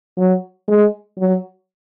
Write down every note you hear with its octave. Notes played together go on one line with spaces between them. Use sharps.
F#3
G#3
F#3